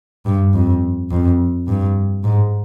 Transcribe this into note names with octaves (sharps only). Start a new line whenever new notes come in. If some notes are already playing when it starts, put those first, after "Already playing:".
G2
F2
F2
G2
G#2